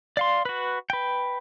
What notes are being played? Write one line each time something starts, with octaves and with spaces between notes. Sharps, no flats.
D5 F5 C6
F#4 B4
B4 G5